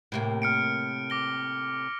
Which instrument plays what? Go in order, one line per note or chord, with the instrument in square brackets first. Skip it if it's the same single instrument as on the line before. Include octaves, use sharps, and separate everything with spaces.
[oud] A2 C3 A#3
[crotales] F6 C#7 D7
D6 A#6 G7